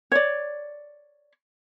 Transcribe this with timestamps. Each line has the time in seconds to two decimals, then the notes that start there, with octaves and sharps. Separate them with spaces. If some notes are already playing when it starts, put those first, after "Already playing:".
0.12 C#5 D5